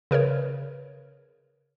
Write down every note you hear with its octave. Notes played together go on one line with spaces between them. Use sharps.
C#3 A#4 B4 C#5